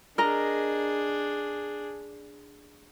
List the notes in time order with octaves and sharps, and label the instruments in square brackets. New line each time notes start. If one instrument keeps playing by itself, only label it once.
[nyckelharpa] D4 G#4 [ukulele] A#4 D#5 A#5